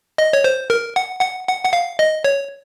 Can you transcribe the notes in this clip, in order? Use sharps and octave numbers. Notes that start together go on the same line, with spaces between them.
D#5
C#5
C5
A#4
F#5
F#5
F#5
F#5
F5
D#5
C#5